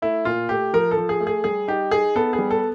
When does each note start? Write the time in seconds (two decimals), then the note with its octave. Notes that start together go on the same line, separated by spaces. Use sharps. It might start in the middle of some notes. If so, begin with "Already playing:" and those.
0.02 A3 E4
0.25 A#2 F4
0.49 A3 G4
0.73 F3 A#4
0.91 A4
0.97 F3
1.09 G#4
1.20 A3
1.27 G#4
1.44 G3 G#4
1.68 D#4 G4
1.91 D#4 G#4
2.16 B3 A4
2.33 G#4
2.39 G3
2.51 A4